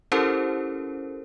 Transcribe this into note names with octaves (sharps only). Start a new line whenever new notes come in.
C#4 E4 G4 A4 A#4 C5